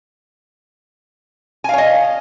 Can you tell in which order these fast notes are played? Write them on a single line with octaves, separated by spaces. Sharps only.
G#5 F5 C#5 D#5